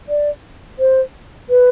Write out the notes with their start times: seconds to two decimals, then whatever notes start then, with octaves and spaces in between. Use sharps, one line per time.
0.09 D5
0.79 C5
1.50 B4